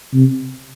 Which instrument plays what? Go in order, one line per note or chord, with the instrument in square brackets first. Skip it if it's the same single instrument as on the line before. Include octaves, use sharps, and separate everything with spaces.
[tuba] C3